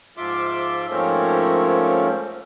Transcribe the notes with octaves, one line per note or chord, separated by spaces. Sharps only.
G#2 F3 F4 E5 C6 D6
G#2 F3 A3 A#3 C4 C#4